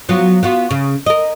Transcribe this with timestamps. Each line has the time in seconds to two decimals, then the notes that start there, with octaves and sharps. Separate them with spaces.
0.09 F#3 B3 F4
0.43 B3 F4 F#4
0.71 C#3
1.06 A#4 D#5